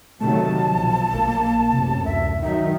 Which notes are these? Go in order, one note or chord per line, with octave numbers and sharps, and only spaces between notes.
C3 D#3 F#3 A3 A5
B1 F3
A#1 A#3
A1 F#2 C3
D2 E5
D#3 F#3 D#4 E5